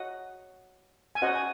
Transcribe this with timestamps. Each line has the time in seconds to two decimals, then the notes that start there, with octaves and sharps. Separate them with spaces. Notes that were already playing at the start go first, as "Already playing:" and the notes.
Already playing: F#4 C#5 D#5 F#5
1.15 G#5
1.22 C#4 F#4 C5 D#5 F#5
1.35 G#5